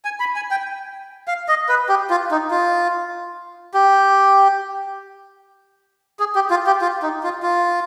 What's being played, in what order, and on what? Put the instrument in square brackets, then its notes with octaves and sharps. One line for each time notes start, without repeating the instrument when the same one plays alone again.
[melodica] G#5
B5
G#5
G5
F5
D#5
B4
G4
F4
D#4
F4
G4
G#4
G4
F4
G4
F4
D#4
F4
F4